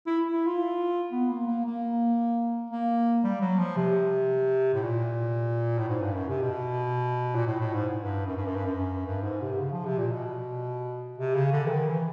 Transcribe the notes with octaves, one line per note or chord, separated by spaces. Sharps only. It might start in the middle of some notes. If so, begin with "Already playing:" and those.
E4
E4
F4
B3
A#3
A#3
A#3
A#3
G3
F#3
F3
C3
A2
A#2
A2
G#2
G2
F#2
C3
B2
A#2
A2
A2
G#2
G2
F#2
G2
F#2
G2
F#2
G2
G#2
C3
C#3
F3
C3
A#2
B2
C3
C#3
D3
E3
D#3
E3